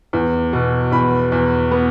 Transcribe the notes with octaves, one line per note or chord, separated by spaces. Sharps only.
E2
B2
E2 B5
E2
B3